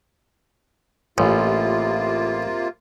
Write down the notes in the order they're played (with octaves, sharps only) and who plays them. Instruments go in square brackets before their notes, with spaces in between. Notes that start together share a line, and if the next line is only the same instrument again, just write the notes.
[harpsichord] A1 [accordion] C3 A#3 F4